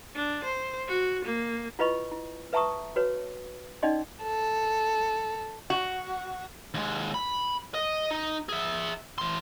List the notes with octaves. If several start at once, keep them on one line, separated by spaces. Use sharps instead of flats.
D4
C5
F#4
A#3
E4 F4 B4 D#5 B5 C#6
E4
B4 E5 A5 A#5 C#6 D#6
F#4 B4 C#5
C#4 D#4 D5 D#5 C6
A4
F#4
D#2 G#3
B5
D#5
D#4
G#4 E5
E3 C6